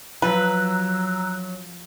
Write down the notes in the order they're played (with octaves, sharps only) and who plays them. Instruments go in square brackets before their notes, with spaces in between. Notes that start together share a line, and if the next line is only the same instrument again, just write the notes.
[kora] F3 [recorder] F#3 [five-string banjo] B4 [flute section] A#5 E6 F#6